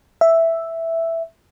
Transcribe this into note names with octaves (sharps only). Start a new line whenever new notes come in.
E5